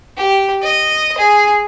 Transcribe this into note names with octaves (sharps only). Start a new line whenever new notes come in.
G4
D#5
G#4